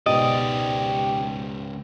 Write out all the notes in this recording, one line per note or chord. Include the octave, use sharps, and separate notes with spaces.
C#2 G#2 B2 G4 D5 D#5